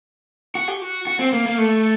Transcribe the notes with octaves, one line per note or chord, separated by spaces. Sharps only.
F#4
G4
F#4
F#4
C4
A#3
A#3
A3